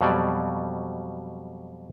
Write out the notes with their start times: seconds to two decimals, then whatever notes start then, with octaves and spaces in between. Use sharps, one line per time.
0.01 F2 B2 F#3 G3 D5